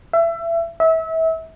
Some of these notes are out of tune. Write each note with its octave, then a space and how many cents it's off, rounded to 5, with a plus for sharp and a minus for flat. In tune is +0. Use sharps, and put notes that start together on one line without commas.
E5 +25
E5 -30